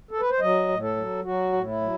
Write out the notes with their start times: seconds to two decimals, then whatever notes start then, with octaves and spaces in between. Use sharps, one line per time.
0.11 A4
0.20 B4
0.30 C5
0.40 F#3 D#5
0.68 A2
0.82 A4
0.96 F#3
1.24 F#3 F#4
1.53 A2
1.67 E4
1.81 F#3